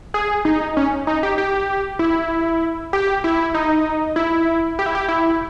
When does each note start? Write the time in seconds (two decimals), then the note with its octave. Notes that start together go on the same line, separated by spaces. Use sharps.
0.14 G#4
0.45 D#4
0.77 C#4
1.07 D#4
1.23 G4
1.38 G4
1.99 E4
2.93 G4
3.24 E4
3.54 D#4
4.16 E4
4.79 G4
4.86 E4
4.95 G4
5.08 E4